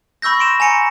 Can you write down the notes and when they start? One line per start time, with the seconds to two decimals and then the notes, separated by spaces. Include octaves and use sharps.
0.22 B5 C#6 E6 G6 A#6
0.39 C6 D7 E7
0.60 G#5 A#5 C#7 D7